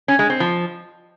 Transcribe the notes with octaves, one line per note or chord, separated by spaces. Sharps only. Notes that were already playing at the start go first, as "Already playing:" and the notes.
C#4
G#3
C4
F3